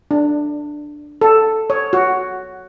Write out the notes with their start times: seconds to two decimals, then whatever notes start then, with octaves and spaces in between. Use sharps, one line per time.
0.11 D4
1.21 A4
1.70 C#5
1.93 F#4